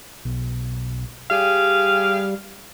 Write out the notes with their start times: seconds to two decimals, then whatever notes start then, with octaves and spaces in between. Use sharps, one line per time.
0.25 B1
1.31 G3 G4 G#4 F5